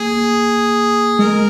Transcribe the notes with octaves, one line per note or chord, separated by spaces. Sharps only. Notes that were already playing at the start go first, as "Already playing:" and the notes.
Already playing: A#3 G#4
G#3 A#4